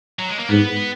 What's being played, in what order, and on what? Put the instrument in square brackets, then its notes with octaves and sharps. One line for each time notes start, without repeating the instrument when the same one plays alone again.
[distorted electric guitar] F#3
G#3
A#3
[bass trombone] G#2 [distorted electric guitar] B3